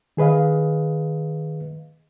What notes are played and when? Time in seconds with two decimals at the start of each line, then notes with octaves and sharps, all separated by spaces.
0.17 D#3 G#4 B4 D#5 F5